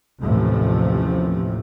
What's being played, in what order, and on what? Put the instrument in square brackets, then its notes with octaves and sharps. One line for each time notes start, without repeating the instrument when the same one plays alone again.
[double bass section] A1 D#2 A2 C3 F3 A3